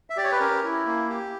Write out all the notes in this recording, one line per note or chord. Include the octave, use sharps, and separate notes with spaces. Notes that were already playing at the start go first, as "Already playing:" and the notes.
E5
G4 D5
C#5
B4
C#4 A#4
E4
A#3
G4